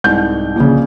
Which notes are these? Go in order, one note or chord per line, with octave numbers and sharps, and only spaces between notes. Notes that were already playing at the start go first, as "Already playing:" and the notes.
C2 G#2 G6
A#1 C#3